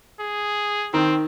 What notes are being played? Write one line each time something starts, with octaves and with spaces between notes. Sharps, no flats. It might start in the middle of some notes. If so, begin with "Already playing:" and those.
G#4
D#3 C4